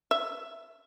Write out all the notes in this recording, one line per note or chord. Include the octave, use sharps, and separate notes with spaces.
E5